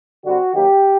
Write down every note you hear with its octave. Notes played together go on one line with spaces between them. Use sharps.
D3 G3 C4 F#4
D#3 F#3 A#3 G4